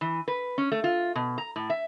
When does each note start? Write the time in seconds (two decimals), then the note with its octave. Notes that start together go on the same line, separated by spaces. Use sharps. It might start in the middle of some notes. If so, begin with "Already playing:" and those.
0.01 E3
0.28 B4
0.58 C#4
0.72 A3
0.84 F4
1.15 B2
1.38 A#5
1.56 A2
1.70 E5